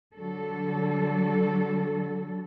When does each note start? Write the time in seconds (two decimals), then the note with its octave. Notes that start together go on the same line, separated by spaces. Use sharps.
0.14 D3 F#3 G3 A4